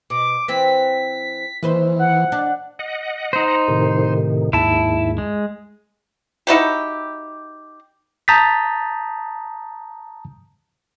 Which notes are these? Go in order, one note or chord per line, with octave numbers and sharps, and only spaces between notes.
B2 D6
E3 C4 B6
D#2 E3 B4 C5
F#5
D4
D#5 F#5
D#4 C5
A2 C3 D#3
D#2 G#2 E4 A5
G#3
D#4 E4 F#4 G4
A5 A#5 D#6 G6 A6 B6